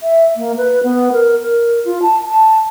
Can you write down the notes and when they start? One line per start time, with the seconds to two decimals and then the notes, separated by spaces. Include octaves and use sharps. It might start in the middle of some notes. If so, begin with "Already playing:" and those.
0.03 E5
0.37 A#3
0.57 B4
0.84 B3
1.13 A#4
1.41 A#4
1.85 F4
2.02 A5
2.27 A5